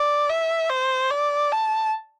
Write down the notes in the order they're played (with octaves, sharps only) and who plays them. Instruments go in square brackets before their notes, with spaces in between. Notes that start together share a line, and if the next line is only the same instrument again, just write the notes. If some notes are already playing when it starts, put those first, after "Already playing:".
Already playing: [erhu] D5
E5
C5
D5
A5